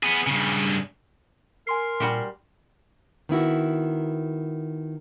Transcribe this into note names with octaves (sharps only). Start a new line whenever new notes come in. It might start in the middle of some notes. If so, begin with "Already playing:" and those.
B3 G#4
G2 C#3
A#4 G#5 C6 C7
A#2 G3 F#4 G4
D#3 B3 E4 F#4